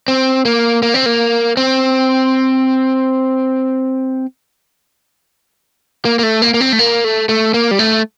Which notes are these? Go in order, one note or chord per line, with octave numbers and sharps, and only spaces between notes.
C4
A#3
A#3
C4
A#3
C4
A#3
A#3
A3
A#3
A#3
C4
A3
A#3
A3
A3
A#3
G3
A3